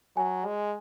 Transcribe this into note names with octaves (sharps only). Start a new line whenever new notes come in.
F#3 G#5
G#3